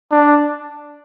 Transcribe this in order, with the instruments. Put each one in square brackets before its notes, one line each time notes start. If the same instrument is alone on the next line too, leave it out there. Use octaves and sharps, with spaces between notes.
[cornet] D4